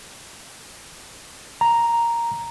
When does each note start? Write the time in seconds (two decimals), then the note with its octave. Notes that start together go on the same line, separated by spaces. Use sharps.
1.61 A#5